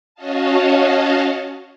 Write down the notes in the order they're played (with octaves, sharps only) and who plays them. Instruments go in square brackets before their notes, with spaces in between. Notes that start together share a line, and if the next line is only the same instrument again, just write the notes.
[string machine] C#4 F#4 C#5 D#5 F5 A5